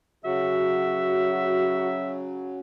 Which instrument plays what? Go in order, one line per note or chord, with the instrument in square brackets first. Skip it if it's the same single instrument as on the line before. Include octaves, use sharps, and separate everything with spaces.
[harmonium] C#3 F#3 [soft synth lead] F#4 [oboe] E5